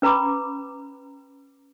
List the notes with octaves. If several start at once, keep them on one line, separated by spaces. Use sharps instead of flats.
C#4 B4 A#5 B5 D6